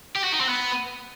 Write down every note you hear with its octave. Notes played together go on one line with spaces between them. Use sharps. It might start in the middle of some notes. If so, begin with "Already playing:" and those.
G4
F#4
D#4
C4
B3